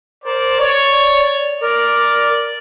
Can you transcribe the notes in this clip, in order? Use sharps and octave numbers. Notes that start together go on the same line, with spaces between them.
A#4 C5 D5
C#5 D5
A#4 D5